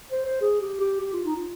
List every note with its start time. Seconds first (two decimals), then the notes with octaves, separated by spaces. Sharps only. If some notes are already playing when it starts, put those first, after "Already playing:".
0.12 C5
0.26 C5
0.41 G#4
0.62 G4
0.81 G4
1.00 G4
1.13 F4
1.25 D#4
1.36 F4